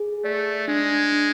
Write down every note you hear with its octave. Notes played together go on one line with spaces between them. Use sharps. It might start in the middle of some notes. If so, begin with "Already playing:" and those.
Already playing: G#4
A3 D5
G#3 D4
D4